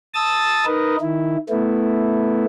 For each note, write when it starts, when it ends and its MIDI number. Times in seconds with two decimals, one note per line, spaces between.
0.14 0.65 81
0.14 0.65 87
0.14 0.65 88
0.14 0.65 93
0.65 0.96 63
0.65 0.96 70
0.65 0.96 71
0.65 0.96 75
1.01 1.37 51
1.01 1.37 64
1.49 2.45 57
1.49 2.45 59
1.49 2.45 64